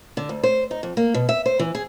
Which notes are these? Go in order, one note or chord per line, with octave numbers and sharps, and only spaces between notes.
D3
D2
C5
D#4
F2
A#3
B2
E5
C5
E3
G#4